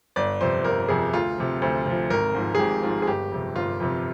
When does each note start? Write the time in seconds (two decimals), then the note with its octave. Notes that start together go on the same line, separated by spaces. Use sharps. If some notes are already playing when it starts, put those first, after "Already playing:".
0.16 G1 D5
0.41 F2 C3 C5
0.65 G1 A#4
0.89 F2 C3 G#4
1.13 D2 F4
1.37 C3 F3
1.62 D2 C5
1.86 C3 F3
2.10 G#1 A#4
2.35 G#2 F3
2.55 G#4
2.59 G#1 G4
2.83 G#2 F3 F4
3.02 G#4
3.07 G1 G4
3.31 F2 C3
3.56 G1 F4
3.80 F2 C3